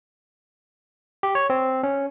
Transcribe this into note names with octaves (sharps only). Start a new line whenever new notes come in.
G4
C#5
C4
C#4